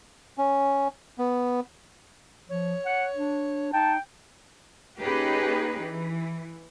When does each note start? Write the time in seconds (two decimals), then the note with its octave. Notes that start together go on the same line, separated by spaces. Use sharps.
0.38 C#4
1.18 B3
2.49 F3 C#5
2.86 F#5
3.15 D4
3.73 D#4 G5 A5
4.98 A#3 C#4 D#4 G4 G#4 B4
5.81 E3